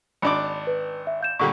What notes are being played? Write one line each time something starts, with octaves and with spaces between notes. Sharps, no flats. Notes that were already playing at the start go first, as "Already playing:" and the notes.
G#1 D4 B5 D6
B4
E5
F5 G6 E7
A#2 D3 G3 C#6